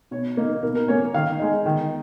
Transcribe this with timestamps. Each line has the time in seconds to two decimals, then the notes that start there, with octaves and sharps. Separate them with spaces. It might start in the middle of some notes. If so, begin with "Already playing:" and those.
0.11 B2 C#5
0.37 A#3 D#4
0.63 B2 A#4
0.75 A#4
0.88 A#3 C#4 C#5
1.14 D#3 F5
1.39 G#3 D#4
1.66 D#3